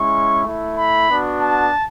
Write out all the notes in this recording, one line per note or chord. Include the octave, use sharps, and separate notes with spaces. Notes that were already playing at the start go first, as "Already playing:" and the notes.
Already playing: G#3 C#4 E4 C#6
A3 E4
B5
B3 D4 F#4
A5